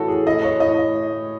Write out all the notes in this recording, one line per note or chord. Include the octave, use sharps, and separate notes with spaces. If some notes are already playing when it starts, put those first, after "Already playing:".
Already playing: A2 E3 F#4 A4 C#5
G#4
A2 D#5
C#5
A2 D#5